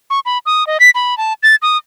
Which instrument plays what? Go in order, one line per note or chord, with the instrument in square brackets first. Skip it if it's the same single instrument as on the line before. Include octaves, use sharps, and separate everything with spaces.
[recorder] C#6
B5
D#6
D#5
B6
B5
A5
A6
D#6